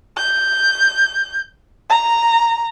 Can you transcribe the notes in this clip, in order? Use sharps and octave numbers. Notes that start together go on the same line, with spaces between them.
G6
A#5